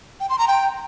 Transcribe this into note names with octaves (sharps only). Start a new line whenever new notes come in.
G5
C6
A#5
G5